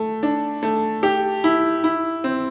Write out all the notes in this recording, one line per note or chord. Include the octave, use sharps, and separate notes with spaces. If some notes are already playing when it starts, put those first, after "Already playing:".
Already playing: A3
D4
A3
G4
E4
E4
C4